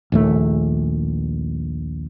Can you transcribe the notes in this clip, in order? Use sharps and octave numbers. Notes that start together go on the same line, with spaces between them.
A#1 D#2 A3